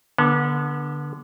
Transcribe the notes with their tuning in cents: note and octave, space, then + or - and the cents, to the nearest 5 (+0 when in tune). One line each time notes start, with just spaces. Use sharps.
D3 +0 B3 -35